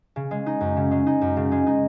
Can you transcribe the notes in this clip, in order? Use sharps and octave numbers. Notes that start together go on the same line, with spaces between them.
C#3
G#3
D#4
F#2
C#3
G#3
D#4
F#2
C#3
G#3
D#4